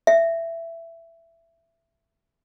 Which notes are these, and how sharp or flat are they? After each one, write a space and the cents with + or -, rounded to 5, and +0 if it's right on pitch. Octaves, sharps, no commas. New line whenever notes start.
E5 +15